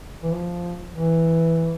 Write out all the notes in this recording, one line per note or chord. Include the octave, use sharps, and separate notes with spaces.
E3
F3
E3